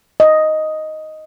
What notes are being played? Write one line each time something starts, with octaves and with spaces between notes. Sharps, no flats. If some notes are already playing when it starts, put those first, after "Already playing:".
D#5